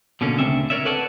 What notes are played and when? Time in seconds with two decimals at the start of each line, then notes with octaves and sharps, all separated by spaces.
0.21 B2 D3 A#3 C#4
0.39 D2 C#3 C4 D4 E5
0.70 A#4 C#5 D5 E5
0.85 A4 B4 C#5 D5 F#5 A5